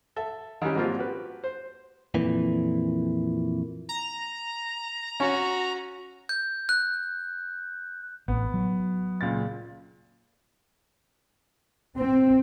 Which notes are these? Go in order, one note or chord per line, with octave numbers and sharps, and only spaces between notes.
A4 E5 A5
D#3 E3 G3 C#4
G#2 F3 G3 A#3 C4 F4
F#4 G4 B4
C5
F2 A#2 E3
A#5
C#4 F#4
G6
F#6
A1 B3
F#3
C#2 A#2 A6
C4